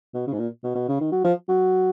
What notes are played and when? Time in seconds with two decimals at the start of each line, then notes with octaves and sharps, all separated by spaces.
0.14 B2
0.27 C#3
0.33 G#2
0.39 A#2
0.63 B2
0.75 B2
0.88 C#3
1.01 D#3
1.12 F#3
1.24 F3
1.48 F#3